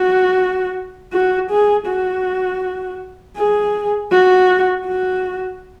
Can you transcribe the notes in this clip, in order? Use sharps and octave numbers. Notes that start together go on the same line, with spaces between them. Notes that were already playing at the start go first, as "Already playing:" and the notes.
Already playing: F#4
F#4
G#4
F#4
G#4
F#4
F#4